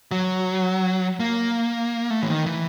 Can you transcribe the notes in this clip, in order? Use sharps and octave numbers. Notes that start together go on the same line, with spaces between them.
F#3
A#3
A3
E3
D#3
E3